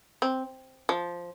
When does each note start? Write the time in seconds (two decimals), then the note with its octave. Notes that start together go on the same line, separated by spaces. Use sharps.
0.22 C4
0.89 F3